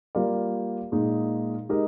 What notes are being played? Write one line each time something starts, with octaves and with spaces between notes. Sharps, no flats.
G3 A#3 F4 A#4 D5
A#2 G#3 D#4
G#3 D#4 G4 A#4 D#5